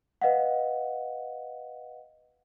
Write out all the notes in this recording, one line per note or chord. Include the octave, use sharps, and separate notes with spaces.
B4 D#5 F5 F#5